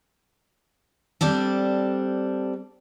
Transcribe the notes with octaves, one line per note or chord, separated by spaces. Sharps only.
G3 C4 D4 A4